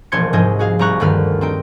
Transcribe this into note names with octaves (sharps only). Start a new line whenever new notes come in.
E1 A#1 C5 C6 G#6 C#7
C2 G#2 F3 G#4 D#5 G6
F#4 G#4 F5
C2 G3 A#5 C#6 F#6
D2 G2 D#3 G3 B4 F6
C4 D#4 G5